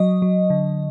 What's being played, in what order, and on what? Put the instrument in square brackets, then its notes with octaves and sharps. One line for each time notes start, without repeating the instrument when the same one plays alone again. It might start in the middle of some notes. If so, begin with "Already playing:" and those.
Already playing: [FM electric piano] F#3 D#5
F#3
D3